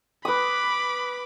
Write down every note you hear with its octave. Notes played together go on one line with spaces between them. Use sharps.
B4 B5 D6 D#6